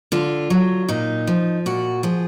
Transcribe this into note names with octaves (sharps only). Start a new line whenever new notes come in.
D3 F4
F#3
A#2 D#4
F3
A#2 F#4
F3 G#4